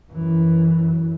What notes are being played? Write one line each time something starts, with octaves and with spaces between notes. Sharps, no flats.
F#2 E3